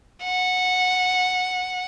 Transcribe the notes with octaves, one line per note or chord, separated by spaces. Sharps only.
F#5